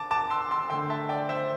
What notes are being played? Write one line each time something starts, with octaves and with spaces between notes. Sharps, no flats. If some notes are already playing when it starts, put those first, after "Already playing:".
Already playing: A5 D6
A5 D6
C6 E6
C6 E6
D3 A3 G5 C6
E5 A5
D5 G5
C5 E5